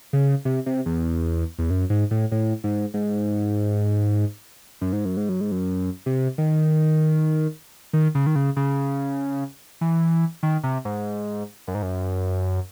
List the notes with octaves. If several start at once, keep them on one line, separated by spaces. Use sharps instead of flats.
C#3
C3
C3
E2
E2
F#2
G#2
A2
A2
G#2
G#2
F#2
G#2
F#2
G#2
F#2
G#2
F#2
C3
D#3
D#3
C#3
D#3
C#3
C#3
E3
D#3
C3
G#2
F#2
G#2
F#2